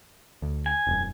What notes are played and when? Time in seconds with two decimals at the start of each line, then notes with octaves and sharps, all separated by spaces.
0.42 D2
0.66 G#5
0.87 E1 F#2